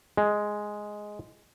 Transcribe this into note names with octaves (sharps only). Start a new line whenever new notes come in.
G#3